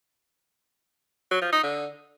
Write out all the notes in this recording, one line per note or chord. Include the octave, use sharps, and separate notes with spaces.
F#3
F3
D#4
D3